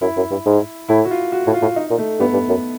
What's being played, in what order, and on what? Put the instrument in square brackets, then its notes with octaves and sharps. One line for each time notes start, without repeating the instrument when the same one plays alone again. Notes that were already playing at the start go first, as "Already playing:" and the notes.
[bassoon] F#2 [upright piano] E4
[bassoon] F#2
G2
G#2
[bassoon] A2 [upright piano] E4
[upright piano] F#4
F4
F#4
[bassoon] A2
[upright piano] F4
[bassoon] A2
[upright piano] D#4
[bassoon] A#2
[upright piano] A3
[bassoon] G2 [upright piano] B3
[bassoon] G2
F#2